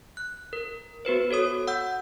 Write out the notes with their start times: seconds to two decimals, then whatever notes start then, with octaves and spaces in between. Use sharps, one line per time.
0.17 F#6
0.53 A#4
1.05 B3 F#4 B4 C5
1.31 F#4 A4 C#5 D#6
1.67 F#5 E6 G6